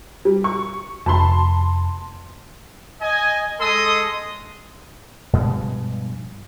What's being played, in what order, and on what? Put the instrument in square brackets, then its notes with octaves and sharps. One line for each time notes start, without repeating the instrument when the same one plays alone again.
[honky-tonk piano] G3
C#6
[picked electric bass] F1 [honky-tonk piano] A5 B5 C6
[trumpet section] D#5 G#5
G#3 A4 D#5 C6 D#6
[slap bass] G2 B2 F3 G#3